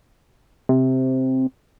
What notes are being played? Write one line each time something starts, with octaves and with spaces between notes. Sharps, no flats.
C3